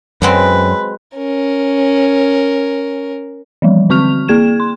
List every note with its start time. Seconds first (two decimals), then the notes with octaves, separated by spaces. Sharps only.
0.22 F#2 F#3 G#3 C4 B4
1.16 C#4 A#4
3.62 E3 F3 G3
3.90 D3 C4 C#6 F6 F7
4.28 A#3 G#4 G#6 E7
4.60 C6